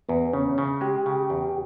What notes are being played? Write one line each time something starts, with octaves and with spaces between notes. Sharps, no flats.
E2 B3
C#3 C#4
C#3
G#3 G4
C#3
E2